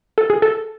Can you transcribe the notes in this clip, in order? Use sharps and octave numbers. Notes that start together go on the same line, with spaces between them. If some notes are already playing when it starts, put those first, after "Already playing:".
A4
G#4
A4